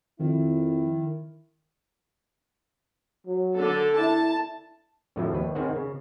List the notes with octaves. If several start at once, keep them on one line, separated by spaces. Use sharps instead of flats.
F2 D#3 E4
F#3
D3 A4
E4 A5
F2 A2 D3 F3 F#3 A3
D#2 B4
D#3 C4 C#4 G#4 C5 F#5
C#3